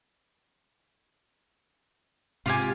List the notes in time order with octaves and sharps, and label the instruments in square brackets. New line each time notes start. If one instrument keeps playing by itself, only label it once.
[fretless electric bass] G#2 C3 [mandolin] F4 G4 G#5